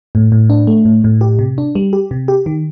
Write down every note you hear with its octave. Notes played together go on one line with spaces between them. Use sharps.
A2
A2
D4
A3
A2
A2
G4
C3
D4
G3
G4
C3
G4
D#3